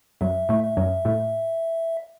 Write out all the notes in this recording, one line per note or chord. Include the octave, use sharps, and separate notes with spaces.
F#2 F#3 E5
A2 A3
E5
F#2 F#3
A2 A3